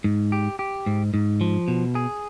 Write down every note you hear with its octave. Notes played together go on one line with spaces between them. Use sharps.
G#2
G4
G4
G#2
G#2
F3
B2
G#4